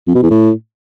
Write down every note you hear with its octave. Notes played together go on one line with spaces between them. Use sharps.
F2
B2
E2
A2